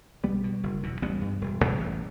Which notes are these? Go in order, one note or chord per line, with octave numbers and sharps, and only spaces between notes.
B1 G3 B3
B2
F#1
E2 B2
A1 G3 B3
G2
E1
E2 B2
A1